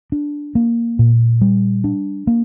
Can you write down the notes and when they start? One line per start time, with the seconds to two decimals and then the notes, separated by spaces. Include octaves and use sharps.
0.12 D4
0.55 A#3
0.99 A#2
1.41 G3
1.84 D4
2.27 A#3